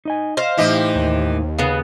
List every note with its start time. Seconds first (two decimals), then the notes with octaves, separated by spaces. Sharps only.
0.05 D#4 D#5 G#5
0.37 C5 D#5 F5
0.58 A2 E3 D#4 E4 G4 D#5
0.95 D#2
1.58 C#3 B3 F5